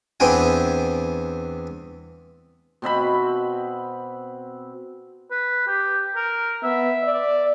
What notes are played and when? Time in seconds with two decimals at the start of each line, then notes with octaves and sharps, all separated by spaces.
0.20 E2 B3 C4 D4 G5 G#5
2.82 B2 C4 E5 B5
5.31 B4
5.67 G4
6.16 A#4
6.63 B3 E5
7.03 D5